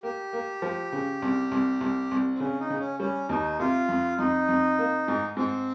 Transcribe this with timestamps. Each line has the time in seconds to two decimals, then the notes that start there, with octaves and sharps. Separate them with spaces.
0.03 A#3 G4
0.33 A#3
0.62 F3
0.92 C#3
1.22 C2
1.51 C2
1.81 C2
2.11 C2
2.34 C4
2.40 C#3 C#4
2.60 D#4
2.70 C#3
2.80 C#4
3.00 G3 C#4
3.29 D#2 D#4
3.59 C3 F4
3.89 F2
4.18 F2 D#4
4.48 F2
4.78 A#3
5.08 G#2
5.37 G#2 C4